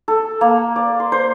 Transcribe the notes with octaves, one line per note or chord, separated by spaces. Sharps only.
A4
A#3
D5
C6
C5